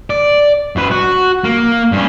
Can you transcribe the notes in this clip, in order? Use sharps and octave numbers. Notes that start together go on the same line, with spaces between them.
D5
F#2 B4
F#4
A#3
G2 C#4